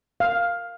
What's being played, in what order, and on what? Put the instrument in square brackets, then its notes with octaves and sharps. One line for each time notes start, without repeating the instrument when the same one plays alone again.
[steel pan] F5